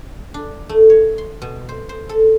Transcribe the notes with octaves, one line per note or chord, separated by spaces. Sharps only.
D4
A3
C#5
C6
B2
C5
C5
A4